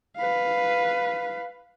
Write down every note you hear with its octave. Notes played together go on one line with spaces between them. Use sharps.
B4 F5